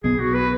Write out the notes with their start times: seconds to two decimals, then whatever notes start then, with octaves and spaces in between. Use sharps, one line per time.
0.04 B1 B2 B3 G#4
0.20 F#4
0.34 B4